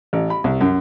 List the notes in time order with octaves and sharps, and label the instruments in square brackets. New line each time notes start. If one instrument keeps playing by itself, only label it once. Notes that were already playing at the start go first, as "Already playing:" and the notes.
[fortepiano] A1
B5
C2
F#2